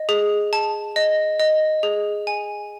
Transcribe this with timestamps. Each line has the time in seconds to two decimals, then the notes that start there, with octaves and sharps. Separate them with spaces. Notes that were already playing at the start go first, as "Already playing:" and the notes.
Already playing: D#5
0.09 G#4
0.53 A5
0.96 D#5
1.40 D#5
1.83 G#4
2.27 G#5